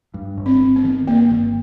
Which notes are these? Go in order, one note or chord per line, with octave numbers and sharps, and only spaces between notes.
G2
G1
C4
G1
B3
D#3
G2 A#3
G1